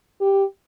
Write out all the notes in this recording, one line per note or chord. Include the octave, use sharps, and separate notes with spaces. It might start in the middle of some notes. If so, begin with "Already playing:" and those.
G4